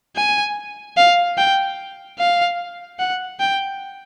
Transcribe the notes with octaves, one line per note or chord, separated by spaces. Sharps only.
G#5
F5
G5
F5
F#5
G5